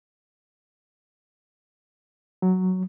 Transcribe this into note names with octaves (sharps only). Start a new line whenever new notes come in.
F#3